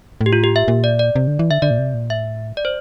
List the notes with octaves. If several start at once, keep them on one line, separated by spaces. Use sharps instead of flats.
A2
G4
F4
G4
E5
A#2
D5
D5
C3
D3
E3
D3 E5
D3 D5
A#2
C3
A#2
A2 E5
D5
C5